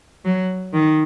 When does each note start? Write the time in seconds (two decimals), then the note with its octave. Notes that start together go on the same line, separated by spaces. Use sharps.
0.25 F#3
0.73 D#3